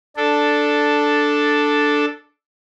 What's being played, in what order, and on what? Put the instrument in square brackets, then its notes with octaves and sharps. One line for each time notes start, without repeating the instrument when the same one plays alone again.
[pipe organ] D4 A4